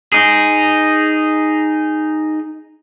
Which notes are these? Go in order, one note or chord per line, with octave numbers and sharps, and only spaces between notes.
D#4 G#4